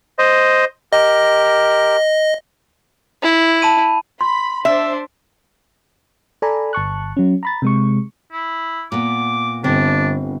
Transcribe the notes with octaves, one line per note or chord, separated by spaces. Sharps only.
C5 D#5
G4 A#4 D#5
E4
A5 B5 D#7
B5 C6
D4 C5 E5
A4 D5 G#5 A#5 B5
G1 A5 C#6 F#6
F#3 C#4
A#5 B5 A6
C3 G#3 C#6
E4
A#2 B3 D6
G1 C4 D4